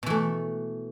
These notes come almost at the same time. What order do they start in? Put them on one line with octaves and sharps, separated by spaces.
B2 E3 A3